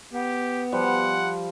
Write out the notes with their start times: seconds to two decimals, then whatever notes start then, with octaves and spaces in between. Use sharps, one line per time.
0.13 B3 G4
0.72 F3 G3 F#5